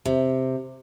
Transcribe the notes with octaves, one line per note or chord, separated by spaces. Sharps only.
C3